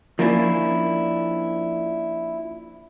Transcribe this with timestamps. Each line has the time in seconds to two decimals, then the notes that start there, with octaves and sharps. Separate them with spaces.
0.19 F3 A#3 C#4 D4 E4